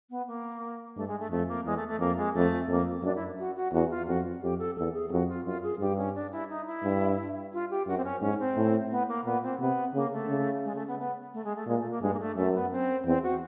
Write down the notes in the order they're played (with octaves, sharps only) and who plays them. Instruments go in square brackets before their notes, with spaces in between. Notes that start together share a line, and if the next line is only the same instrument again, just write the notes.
[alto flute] B3
A#3
[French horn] G2 [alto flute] A3
[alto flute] G#3
A3
[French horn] F2 [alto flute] A3
[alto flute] A#3
[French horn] E2 [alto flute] G#3
[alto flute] A3
A3
[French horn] F2 [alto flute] A#3
[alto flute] G#3
[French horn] F2 [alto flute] A3
[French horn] F2 [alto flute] A#3
[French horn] F#2 [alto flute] D4
[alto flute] E4
F#4
F#4
[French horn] E2 [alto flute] F#4
[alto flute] F4
[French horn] F2 [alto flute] F#4
[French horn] F2 [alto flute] G4
[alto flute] A4
[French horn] E2 [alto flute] A4
[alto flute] G#4
[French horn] F2 [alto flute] F#4
[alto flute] F4
[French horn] F#2 [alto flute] F4
[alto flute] G#4
[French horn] G2 [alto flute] G4
[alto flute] C#4
D4
E4
D#4
E4
[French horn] G2
[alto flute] F4
G4
[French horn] F#2 [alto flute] F#4
[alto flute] C4
C#4
[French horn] G#2 [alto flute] C#4
[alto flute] C4
[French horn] A2
[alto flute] B3
A#3
[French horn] A#2 [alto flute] B3
[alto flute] C4
[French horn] C3 [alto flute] B3
[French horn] C#3 [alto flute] A#3
[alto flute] A3
[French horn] C#3
[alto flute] G#3
A3
B3
B3
A3
G#3
A3
[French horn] A#2 [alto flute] G#3
[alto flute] A3
A#3
[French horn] G2 [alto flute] G#3
[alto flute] A#3
A3
[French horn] F#2 [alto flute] A3
[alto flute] B3
C4
[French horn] E2 [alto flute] C4
[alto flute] F#4